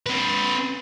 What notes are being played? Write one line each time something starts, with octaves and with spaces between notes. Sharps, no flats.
C4 B4